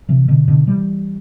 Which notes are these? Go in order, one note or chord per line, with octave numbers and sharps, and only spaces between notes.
C3 E3
B2 D3
B2 D3
E3 G3